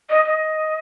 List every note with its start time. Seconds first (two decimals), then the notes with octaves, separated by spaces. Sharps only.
0.09 D#5
0.25 D#5